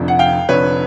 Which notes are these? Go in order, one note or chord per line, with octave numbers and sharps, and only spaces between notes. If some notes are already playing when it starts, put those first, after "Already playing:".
Already playing: F1 F2 D3
F#5
F5 G5
F1 F2 D3 B4 C#5